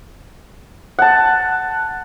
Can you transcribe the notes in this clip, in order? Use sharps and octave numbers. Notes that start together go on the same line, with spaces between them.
F#5 A5